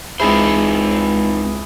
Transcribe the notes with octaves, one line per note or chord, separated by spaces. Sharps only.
C#2 C4 D#4 E4 G#4 C5